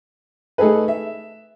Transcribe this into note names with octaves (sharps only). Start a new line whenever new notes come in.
A3 D#4 G#4 A4 B4
E5